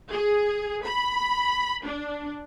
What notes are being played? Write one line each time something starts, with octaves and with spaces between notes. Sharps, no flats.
G#4
B5
D4